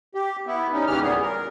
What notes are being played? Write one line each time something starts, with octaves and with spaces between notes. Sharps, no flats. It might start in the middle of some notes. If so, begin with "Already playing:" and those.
G4
B3 E4
G3 C#4 D#4
D#2 C#3 E3 C#4 G4 F6
A#2 G3 B3 G#4
A#4